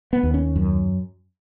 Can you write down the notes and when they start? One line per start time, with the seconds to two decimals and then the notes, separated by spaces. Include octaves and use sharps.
0.13 B3
0.23 D#2
0.34 C#4
0.56 F#2